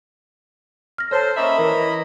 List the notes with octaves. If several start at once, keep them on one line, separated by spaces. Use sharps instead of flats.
F6 A#6
A4 C5 C#5 A5
A#3 C#4 D#5 E5 A#5 B5
E3 A#4